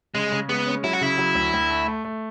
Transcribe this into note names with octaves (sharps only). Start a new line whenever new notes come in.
C#3 G#3
C#3
G#3 B3
C#4
F#3 E4
F#4
C#3 E4
F#3
D2
D2
A3
A3
A3